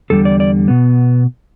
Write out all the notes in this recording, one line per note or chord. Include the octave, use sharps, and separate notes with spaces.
E2 D3 G3 A4
D5
D5
B2 B3